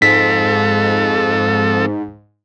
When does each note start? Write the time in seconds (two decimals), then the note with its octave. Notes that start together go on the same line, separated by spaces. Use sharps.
0.02 G#2 C4 F4 A4 B6